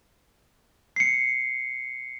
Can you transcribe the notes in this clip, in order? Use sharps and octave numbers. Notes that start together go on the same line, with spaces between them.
C7 C#7